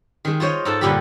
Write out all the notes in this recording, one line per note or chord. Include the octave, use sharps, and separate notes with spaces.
D#3 G#3
F4 C5 C#5 D#5
G#2 A4 A5
G2 A#2 D3 G4 B5